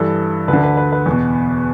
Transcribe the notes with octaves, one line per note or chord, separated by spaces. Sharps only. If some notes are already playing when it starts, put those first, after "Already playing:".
Already playing: G2 E3 A4
D2 B4
D3
B4
B4
B4
E2 B2